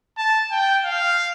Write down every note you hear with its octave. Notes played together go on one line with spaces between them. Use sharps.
A5
G5
F5